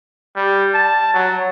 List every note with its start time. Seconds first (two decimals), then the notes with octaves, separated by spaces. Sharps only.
0.36 G3
0.74 A5
1.14 F#3